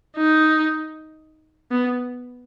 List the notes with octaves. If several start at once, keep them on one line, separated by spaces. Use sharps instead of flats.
D#4
B3